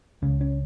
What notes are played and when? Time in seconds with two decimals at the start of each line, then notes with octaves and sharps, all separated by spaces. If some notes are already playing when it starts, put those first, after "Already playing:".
0.22 C#2 C#3 C#4
0.41 C#4